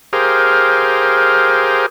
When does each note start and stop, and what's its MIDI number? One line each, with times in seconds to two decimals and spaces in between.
0.13 1.86 67
0.13 1.86 68
0.13 1.86 70
0.13 1.86 72
0.13 1.86 77